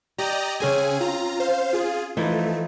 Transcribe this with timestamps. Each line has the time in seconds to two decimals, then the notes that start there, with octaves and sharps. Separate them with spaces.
0.18 G4 D5 D#5 A#5
0.60 C#3 C4 C#4 G#4 G#5
1.00 F4 A#5
1.40 C5 F5
1.73 F4 G#4
2.17 E3 F3 A3 D#4